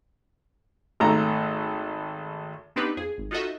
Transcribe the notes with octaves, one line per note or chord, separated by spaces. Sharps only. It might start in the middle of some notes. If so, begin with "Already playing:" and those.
G#1 A3 A#5
B3 C4 D4 D#4 G4 B4
F2 G#4
G#1
D#4 F4 F#4 A4 D#5 E5